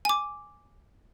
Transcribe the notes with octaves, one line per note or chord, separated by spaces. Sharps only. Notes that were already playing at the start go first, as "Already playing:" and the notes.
G#5 D6